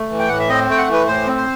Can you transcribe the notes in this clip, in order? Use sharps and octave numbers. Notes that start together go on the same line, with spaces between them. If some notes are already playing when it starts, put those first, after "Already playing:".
Already playing: A3
E3
G5
A2 F#5
E5
C4 D#5
A3 G5
F#5
E3
B4
A2 C5
C4
C5